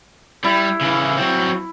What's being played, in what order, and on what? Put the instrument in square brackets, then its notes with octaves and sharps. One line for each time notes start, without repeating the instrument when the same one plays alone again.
[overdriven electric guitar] G3 [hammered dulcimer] E4
[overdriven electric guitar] C#3 E3
F#3 C4